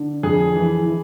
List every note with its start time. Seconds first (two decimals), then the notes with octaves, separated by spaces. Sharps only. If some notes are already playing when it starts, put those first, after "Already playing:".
Already playing: D3
0.23 F2 G#4
0.55 E3
0.86 E3